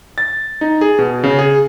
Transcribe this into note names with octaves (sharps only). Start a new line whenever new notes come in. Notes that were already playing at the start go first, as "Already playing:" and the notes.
A6
D#4
G#4
B2
C#3
G#4